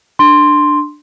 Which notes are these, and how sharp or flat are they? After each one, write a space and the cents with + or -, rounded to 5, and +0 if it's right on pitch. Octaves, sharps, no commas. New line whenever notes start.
D4 +15 C6 +0